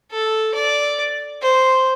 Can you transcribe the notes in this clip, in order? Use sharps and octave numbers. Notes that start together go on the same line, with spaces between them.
A4
D5
C5